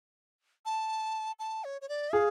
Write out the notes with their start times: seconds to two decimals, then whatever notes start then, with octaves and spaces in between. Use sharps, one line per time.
0.65 A5
1.39 A5
1.64 C#5
1.81 C#5
1.89 D5
2.13 G#4 F5